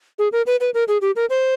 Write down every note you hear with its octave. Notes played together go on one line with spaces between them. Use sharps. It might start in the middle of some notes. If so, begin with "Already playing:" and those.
G#4
A#4
B4
B4
A#4
G#4
G4
A#4
C5